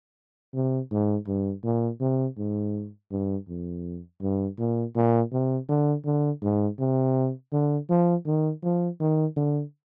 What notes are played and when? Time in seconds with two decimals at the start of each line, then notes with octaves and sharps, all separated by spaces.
0.54 C3
0.91 G#2
1.27 G2
1.64 A#2
2.01 C3
2.38 G#2
3.11 G2
3.49 F2
4.22 G2
4.59 A#2
4.96 A#2
5.32 C3
5.69 D3
6.05 D3
6.42 G#2
6.79 C3
7.52 D3
7.90 F3
8.26 D#3
8.63 F3
9.00 D#3
9.36 D3